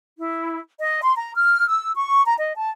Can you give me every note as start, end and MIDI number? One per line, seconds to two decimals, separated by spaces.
0.17 0.58 64
0.79 0.99 75
1.02 1.14 84
1.16 1.34 82
1.34 1.67 89
1.67 1.92 88
1.95 2.21 85
2.25 2.34 82
2.38 2.56 75
2.56 2.69 81